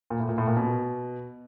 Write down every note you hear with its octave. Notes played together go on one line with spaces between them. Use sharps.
A#2
A2
A#2
A2
A#2
B2